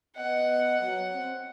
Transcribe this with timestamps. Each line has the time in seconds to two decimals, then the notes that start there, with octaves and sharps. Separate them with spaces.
0.16 B3 D#5 F#5
0.80 F#3
1.13 C4